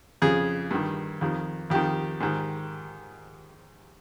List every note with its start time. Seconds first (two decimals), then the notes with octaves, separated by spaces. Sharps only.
0.22 F2 C#3 G#4
0.71 G2 D#3
1.21 F2 D#3
1.70 F2 D#3 G4
2.20 G#2 D#3